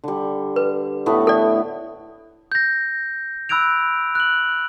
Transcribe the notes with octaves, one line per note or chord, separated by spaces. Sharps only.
D3 G3
B4
A2 A3 B3
A4 D5
G6 A#6
B5 E6 F#6 G#6 D7 F7
F#6 F#7